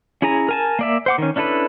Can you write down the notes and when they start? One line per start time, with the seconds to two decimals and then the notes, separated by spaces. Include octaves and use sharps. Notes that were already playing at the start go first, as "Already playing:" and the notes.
0.22 C#4 E4 G#4 G#5 A#5
0.49 A#4 G#5 A5
0.79 A#3 D5 E5
1.06 C5 F#5 D6
1.18 D#3 C#4
1.36 C#4 D4 E4 A4 B4